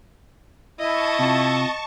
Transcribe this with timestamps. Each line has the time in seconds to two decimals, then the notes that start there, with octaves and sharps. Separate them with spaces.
0.79 E4 D#5 A5 C#6
1.19 C3 F4